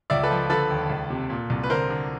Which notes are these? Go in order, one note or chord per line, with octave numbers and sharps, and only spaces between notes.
C#2 D5 E5
A4 B4
F3
D3 A4 B4
D#2
C#2
C3
A#2
C2
B4
D3 A#4 C5
D3